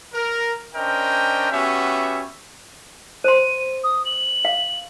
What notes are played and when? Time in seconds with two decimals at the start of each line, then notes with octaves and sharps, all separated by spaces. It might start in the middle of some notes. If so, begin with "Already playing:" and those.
0.13 A#4
0.75 C#4 D4 A#4 C5 D#5 G5
1.52 B3 C#4 F#4 G4 E5
3.24 C5 C6 D#7
3.84 D#6
4.05 F#7
4.45 F5